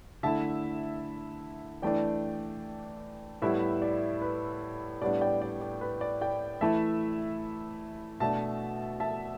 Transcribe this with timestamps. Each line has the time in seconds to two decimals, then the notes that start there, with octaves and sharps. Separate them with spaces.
0.23 D3 A3 E4 E5 A5
1.82 E3 A3 D4 D5 G5
3.42 A2 G3 B3 E4 B4 E5
3.82 D5
4.22 B4
5.02 A2 G3 B3 D4 D5
5.21 D5 G5
5.42 D5
5.61 D5
5.81 B4
6.01 D5
6.21 D5 G5
6.61 E3 A3 E4 E5 A5
8.20 B2 A3 D4 E5 A5
9.00 E5 A5